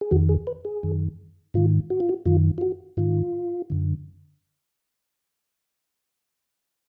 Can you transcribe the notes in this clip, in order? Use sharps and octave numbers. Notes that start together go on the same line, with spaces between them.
G#4
F2 D#3 F#4
G#4
B4
G#4
F#2 D#3
G#2 D#3 F4
F#4
F4
F#4
F#2 D#3 F4
F4
F#4
G#2 D#3 F4
F#2 D3